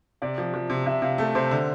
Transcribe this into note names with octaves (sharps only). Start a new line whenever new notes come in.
C3 D5
F3
F3
C3
C3 E5
C3 F5
A3 A4
C3 C5
D3